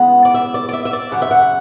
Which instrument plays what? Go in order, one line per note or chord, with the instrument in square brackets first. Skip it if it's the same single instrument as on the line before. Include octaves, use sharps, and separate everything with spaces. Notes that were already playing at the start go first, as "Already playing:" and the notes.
Already playing: [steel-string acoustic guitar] E2 C#3 G#3 B3 F#5
D5
E5
D5
D5
E5
E5
D5
F#2 C#3 F#5
E5
F#5